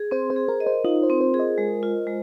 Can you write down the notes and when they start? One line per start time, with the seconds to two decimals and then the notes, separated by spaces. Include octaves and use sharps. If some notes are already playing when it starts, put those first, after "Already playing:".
Already playing: G#4
0.11 C4 C5
0.30 C5
0.36 G#4
0.48 A#4
0.60 D#5
0.67 C5
0.84 D#4 F4
1.03 C5
1.10 C4
1.21 C5
1.34 G#4
1.39 D#5
1.58 G#3
1.83 F4
2.07 G#3